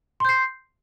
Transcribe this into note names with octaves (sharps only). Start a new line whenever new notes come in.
C6 G6 C7